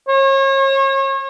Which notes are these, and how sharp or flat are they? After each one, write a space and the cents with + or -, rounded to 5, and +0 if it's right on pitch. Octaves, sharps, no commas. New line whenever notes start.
C#5 -35